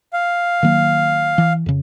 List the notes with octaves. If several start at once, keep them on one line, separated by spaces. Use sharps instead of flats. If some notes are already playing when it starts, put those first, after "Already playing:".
F5
D#3 F#3 A#3
E3
F2 C#3